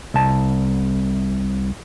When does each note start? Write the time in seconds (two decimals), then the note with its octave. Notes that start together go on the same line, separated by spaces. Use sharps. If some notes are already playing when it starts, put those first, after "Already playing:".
0.14 C2 A5